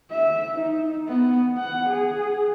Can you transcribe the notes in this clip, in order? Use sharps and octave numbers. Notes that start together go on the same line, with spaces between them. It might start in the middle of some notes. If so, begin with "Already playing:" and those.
E5
D#4
B3
F#5
G#4